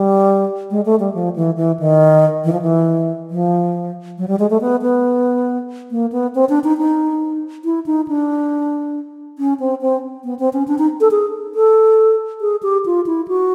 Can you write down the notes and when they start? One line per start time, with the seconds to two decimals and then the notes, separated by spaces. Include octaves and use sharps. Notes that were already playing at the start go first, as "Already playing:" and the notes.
Already playing: G3
0.71 G#3
0.85 A3
1.00 G3
1.14 F3
1.36 E3
1.57 E3
1.79 D#3
2.44 E3
2.52 F3
2.62 E3
3.30 F3
4.18 F#3
4.28 G3
4.39 G#3
4.50 A3
4.61 B3
4.82 B3
5.91 A#3
6.12 B3
6.35 C4
6.49 D4
6.64 D#4
6.78 D#4
7.64 E4
7.86 D#4
8.08 D4
9.38 C#4
9.60 C4
9.81 C4
10.24 B3
10.39 C4
10.53 C#4
10.68 D4
10.78 D#4
11.01 A4
11.11 G#4
11.55 A4
12.41 G#4
12.63 G4
12.86 F4
13.06 E4
13.28 F#4